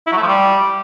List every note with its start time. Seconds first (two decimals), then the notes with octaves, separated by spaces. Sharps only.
0.07 E4
0.12 F#3
0.17 A3
0.23 F3
0.28 G3